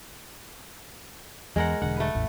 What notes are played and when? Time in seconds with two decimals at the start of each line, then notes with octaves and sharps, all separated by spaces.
1.56 E2 G#3 A#4 F#5
1.82 E1 D3 F#5
1.97 A3 B4
2.15 A1 E2